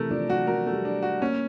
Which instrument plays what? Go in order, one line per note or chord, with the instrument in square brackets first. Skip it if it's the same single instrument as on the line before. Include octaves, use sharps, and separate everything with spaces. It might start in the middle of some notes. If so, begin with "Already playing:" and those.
Already playing: [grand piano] C3 E3 [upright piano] A3 A#4
[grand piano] F3 [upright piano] D4
[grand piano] F#3 [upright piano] F#4
[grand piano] F#3 [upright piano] A#4
[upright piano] A3
[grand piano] G3
[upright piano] D4
F#4
[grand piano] A#3 [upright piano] C#4